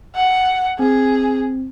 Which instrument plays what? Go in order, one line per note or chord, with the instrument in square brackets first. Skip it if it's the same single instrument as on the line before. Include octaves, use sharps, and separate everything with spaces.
[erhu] F#5
[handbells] C4 [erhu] G#4